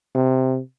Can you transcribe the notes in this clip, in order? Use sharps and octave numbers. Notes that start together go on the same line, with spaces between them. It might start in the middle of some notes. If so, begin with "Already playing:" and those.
C3